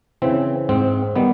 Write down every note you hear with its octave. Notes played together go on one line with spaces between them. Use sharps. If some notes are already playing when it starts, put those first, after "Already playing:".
C#3 E3 C4
G#2 C4
D#3 G3 B3